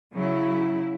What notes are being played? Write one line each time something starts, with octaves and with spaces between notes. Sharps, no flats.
C#3 F#3 E4